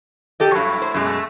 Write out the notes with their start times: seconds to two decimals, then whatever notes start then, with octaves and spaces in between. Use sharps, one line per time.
0.40 G4 A4 D#5
0.52 G2 F#3 E4 C#5
0.82 C5
0.94 F#2 B2 G#3
1.07 A3